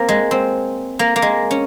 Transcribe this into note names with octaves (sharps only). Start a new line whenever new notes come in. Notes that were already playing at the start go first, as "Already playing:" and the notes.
Already playing: A#3 C4
G#3
C4
A#3
A#3
G#3
C#4